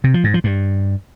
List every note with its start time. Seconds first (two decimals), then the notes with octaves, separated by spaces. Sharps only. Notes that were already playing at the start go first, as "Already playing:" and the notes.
0.04 C3
0.14 F3
0.24 G#2
0.34 F3
0.44 G2